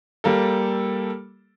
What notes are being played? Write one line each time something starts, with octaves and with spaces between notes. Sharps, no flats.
G3 A#3 A4